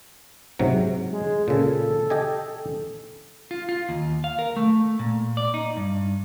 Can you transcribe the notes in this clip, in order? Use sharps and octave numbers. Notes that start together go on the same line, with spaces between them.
G#2 C3 F#3
G#3
A#2 C#3 A4
G4 D#5 G#5
F4
F4
D#2
F5
A#4
A3
A#2
D5
D#4
G2